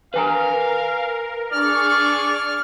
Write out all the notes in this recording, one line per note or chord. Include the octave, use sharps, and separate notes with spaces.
A#4 B4 F5 G#5 A#5
D4 G#4 D5 C#6 F6